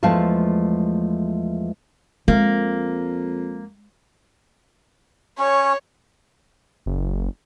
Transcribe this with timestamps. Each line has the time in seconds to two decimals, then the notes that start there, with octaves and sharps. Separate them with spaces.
0.03 E2 F3 G#3 A3 F5 A5
2.28 F2 G#3 A#3
5.39 C#4 C#5
6.86 F#1